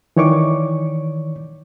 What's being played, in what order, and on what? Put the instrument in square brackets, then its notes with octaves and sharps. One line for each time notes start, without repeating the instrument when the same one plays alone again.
[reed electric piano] D#3 E3 C#5 D5 C#6 D6